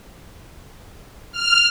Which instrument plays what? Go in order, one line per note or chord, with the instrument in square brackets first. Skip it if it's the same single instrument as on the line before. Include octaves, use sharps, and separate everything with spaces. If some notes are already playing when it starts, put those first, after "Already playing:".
[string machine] F6